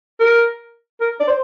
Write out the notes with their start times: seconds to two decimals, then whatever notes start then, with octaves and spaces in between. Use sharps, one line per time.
0.20 A#4
1.01 A#4
1.20 D5
1.28 C5